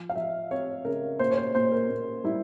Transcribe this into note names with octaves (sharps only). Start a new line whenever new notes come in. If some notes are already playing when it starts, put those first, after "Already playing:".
Already playing: F3
F5
F3 E5
C4 C#5
C#3 A#4
A#2 C5
C#5
C5
A#2 C5
A#4
A#2
G3 E4